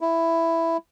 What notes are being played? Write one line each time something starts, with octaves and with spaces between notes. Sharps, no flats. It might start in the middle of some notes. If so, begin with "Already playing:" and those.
E4